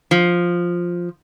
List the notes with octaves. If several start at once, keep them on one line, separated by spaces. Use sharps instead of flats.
F3